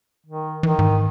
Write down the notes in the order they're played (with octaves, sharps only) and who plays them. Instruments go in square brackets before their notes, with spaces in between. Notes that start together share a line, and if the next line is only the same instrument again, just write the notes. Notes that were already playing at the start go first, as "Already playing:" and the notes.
[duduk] D#3
[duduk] D#3 [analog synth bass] E3
[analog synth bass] G#2